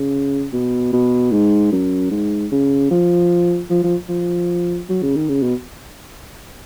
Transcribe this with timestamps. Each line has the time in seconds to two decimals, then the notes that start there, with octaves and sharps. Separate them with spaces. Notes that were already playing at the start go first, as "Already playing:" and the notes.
Already playing: C#3
0.53 B2
0.93 B2
1.32 G#2
1.72 F#2
2.11 G#2
2.52 C#3
2.91 F3
3.70 F3
3.84 F3
4.09 F3
4.89 F#3
5.02 C#3
5.16 D#3
5.29 C#3
5.42 B2